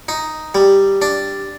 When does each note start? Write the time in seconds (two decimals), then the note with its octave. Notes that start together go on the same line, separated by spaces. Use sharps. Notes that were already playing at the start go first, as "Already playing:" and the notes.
0.09 D#4
0.55 G3
1.02 D4